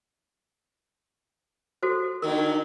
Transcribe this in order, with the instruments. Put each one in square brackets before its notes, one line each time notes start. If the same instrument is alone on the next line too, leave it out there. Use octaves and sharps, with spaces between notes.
[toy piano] F#4 A4 C5
[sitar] A#2 D3 D#3 [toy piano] A#4